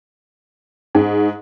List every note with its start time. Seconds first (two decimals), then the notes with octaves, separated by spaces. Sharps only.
0.95 G#2